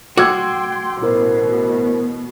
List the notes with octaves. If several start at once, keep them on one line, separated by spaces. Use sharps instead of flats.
F#4 G5 C6 D6 E6 G#6
A1 B2 E4 A#4 C5